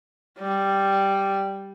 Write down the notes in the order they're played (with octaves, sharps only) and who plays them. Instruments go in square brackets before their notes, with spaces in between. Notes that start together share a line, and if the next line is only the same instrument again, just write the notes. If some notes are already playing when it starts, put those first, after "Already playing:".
[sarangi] G3